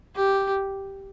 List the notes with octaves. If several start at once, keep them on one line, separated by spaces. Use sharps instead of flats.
G4